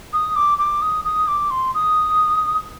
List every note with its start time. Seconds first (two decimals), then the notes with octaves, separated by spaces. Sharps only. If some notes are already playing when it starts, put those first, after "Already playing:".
0.13 D#6
0.36 D6
0.58 D6
0.82 D#6
1.05 D#6
1.28 D6
1.50 C6
1.74 D#6